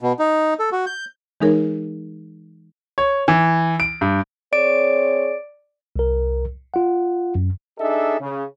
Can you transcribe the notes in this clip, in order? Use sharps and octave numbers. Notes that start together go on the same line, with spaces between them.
B2
D#4
A4
F#4
G6
E3 G#3 D#4 G#4 A#4 C#5
C#5
E3
D7
G2
C4 G#4 C#5 D5 D7
C2 A#4
F4 F#5
F#2
D4 D#4 G#4 A4 D#5 E5
C#3